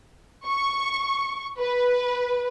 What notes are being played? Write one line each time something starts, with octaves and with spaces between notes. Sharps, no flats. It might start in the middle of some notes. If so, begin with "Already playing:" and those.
C#6
B4